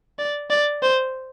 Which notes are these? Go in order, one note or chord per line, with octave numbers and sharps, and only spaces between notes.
D5
D5
C5